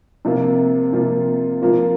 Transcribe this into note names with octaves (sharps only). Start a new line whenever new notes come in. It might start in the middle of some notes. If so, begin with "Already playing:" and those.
C3 F3 A#3 F4
C3 F3 A#3 F4
F3 A#3 F4